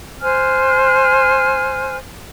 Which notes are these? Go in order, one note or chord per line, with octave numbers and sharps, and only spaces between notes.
C5 G#5 F6 F#6